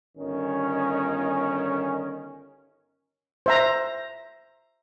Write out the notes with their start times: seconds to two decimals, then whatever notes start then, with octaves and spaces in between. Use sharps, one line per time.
0.18 G1 D#3 C#4
3.46 C5 E5 A#5